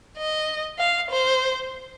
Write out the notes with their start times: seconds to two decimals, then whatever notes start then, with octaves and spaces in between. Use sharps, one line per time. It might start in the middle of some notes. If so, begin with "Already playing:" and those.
0.17 D#5
0.78 F5
1.10 C5